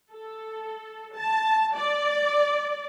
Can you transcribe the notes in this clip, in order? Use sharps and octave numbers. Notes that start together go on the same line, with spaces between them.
A4
A5
D5